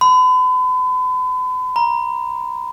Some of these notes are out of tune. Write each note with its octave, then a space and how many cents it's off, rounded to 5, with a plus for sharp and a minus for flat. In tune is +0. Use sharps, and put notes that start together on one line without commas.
B5 +40
A#5 +25